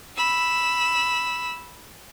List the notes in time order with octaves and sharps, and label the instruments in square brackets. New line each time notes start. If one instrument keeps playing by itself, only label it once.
[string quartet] B5 E6